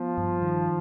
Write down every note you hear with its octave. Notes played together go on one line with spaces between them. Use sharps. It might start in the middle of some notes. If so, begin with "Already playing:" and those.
Already playing: F3 B3
G2
D#3